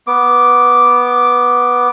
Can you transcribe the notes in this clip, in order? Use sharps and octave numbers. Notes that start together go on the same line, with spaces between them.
B3 D6